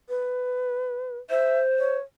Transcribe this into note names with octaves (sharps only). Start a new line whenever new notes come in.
B4
C5 E5
C#5